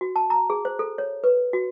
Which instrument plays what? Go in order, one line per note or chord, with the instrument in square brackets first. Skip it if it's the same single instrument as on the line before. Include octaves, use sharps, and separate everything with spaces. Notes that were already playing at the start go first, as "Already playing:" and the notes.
[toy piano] F#4
A5
A#5
G#4
C5
A4
C#5
B4
F#4